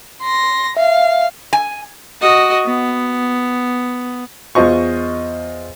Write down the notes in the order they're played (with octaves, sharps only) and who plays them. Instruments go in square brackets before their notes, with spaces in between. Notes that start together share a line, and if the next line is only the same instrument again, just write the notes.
[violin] C6 A#6
[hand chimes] E5 [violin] F5
[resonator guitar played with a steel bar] G#5
[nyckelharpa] F#4 D#5
B3
[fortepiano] E2 F4 C5 D#5 C#6